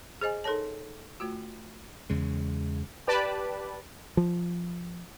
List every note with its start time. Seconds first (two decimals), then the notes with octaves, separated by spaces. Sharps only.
0.21 G#4 C5 D#5 G#5
0.44 D#4 A4 A#4 C#5 A5
1.20 A3 F4 F#4
2.10 E2 C#3 G#3
3.07 G4 B4 D5 A5 B5
4.17 F3